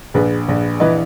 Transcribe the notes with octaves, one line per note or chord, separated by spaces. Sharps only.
A#1 G#4 B4
A#1
E3 B4 D#5